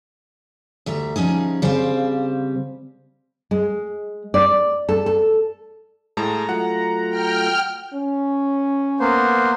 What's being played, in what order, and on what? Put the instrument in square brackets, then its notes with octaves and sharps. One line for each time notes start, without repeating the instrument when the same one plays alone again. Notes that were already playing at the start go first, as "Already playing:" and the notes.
[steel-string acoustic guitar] D2 G3 E5 A#5
F3 G3 C#4 D#4 G#4
C#3 G3 C4 C5 F5 G5
[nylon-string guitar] G#3
D5
A4
A4
[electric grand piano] A2 G#3 A5 [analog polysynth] A#5
[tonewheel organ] F#3 A3 F4 [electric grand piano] F#5
[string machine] G5 F6
[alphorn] C#4
[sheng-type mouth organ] A#3 B3 C5